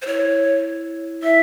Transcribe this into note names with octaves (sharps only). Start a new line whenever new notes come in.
C5
E4 C#5
E4 E5